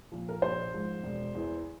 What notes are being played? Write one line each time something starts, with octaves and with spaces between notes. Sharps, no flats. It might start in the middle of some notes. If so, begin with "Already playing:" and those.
A#2 F3
A#4
A#1 C5
G#2 F3
E1
E2 E3